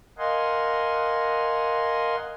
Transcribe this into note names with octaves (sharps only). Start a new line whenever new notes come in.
A#4 D#5 F5 F#5 G#5 C6